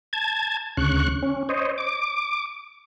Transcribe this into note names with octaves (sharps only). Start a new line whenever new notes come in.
A5 G#6
D2 C#3 C#6 F#6
C#4
C5 C#5 D#5
D6